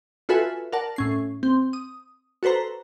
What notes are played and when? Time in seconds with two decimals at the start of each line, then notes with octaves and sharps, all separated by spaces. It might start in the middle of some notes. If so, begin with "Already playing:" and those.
0.29 F4 F#4 A4 B4 E5 G#5
0.73 A#4 D5 F#5 A5
0.96 A2 C#4 C7
1.43 C4
1.73 D#6
2.43 F#4 A4 B4 C5 A#5